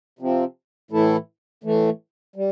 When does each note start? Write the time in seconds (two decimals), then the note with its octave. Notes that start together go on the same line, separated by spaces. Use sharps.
0.19 C3 F3 C4
0.91 A2 E3 A3 E4 A4
1.63 A2 E3 A3
2.36 G3